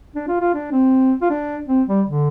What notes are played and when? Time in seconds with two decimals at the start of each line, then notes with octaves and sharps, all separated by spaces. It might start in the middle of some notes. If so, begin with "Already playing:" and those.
0.16 D4
0.28 F4
0.41 F4
0.54 D4
0.72 C4
1.22 F4
1.30 D4
1.68 C4
1.88 G3
2.07 D3